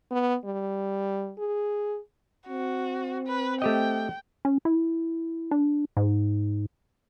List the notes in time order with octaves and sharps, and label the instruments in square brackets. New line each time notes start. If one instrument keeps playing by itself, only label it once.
[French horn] B3
G3
G#4
[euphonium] C4 [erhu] F#4
[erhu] B4
[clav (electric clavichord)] A3 G4 D#5 [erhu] G5
[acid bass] C#4
E4
D4
G#2